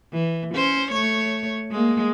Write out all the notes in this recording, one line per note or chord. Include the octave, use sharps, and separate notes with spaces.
E3
C#4 C5
A3 C#5
G#3 A#3